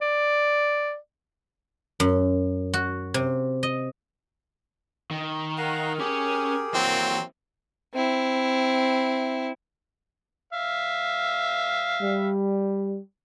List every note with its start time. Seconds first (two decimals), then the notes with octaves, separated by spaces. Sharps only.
0.02 D5
2.00 F#2
2.74 F#4
3.14 C3
3.63 D#5
5.11 D#3
5.58 A#4 F5 F#5 A#5
5.99 C#4 G4 G#4 G#5
6.74 E3 F#3 A#3 C4
7.94 C4 E4
10.53 E5 F5
12.01 G3